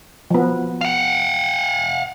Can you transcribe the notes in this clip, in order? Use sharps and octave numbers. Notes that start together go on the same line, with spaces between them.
F3 B3
F5 F#5